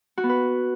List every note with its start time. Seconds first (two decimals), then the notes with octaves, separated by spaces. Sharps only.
0.17 F#4
0.23 B3
0.29 B4